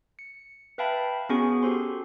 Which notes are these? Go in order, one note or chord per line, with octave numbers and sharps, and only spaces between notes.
C#7
B4 E5 F5 G5 A5 B5
B3 C#4 F#4 G#4 G#5 C#6
F#4 G4 A4 C5 C6